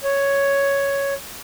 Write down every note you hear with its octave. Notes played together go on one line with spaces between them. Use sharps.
C#5